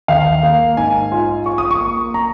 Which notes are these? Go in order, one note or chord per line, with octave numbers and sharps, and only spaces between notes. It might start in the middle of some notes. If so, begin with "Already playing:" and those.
D#2 F5
A#3
G#2 G#5
F4
F4 C#6
D#6
C#6
A#3
A#5